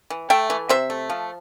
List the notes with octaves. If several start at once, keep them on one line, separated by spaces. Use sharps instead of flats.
E3
A3 E5 G5
E3
C3 C5 E5
A3
F3